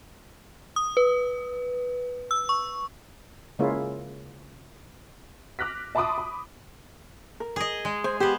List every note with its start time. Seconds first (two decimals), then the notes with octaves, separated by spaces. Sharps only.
0.76 D#6
0.97 B4
2.31 E6
2.49 C#6
3.59 C#3 G#3 A#3 C#4 E4 F4
5.59 D6 F6 F#6 A#6 B6
5.95 E5 A5 B5 C6 D6 D#6
6.18 B5
7.40 A#4
7.56 G#4 D#5
7.85 G#3
8.04 C5 G#5
8.20 B3 G4 C5